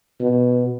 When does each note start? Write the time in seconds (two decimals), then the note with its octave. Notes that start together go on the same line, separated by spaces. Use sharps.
0.21 B2